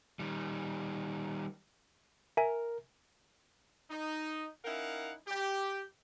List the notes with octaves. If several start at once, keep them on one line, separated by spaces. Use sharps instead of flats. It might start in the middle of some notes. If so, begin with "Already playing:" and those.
D#3 G3
A#4 E5 G#5
D#4
C#4 D#4 E4 A#4 F5 F#5
G4